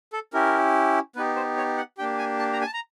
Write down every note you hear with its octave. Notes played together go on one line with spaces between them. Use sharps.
A4
C#4 E4 G4 A#4
B3 D#4 G4 B4
C5
C#5
F#5
A#3 D4 G4 G5
G#5
A5
A#5
G#5
A5
A#5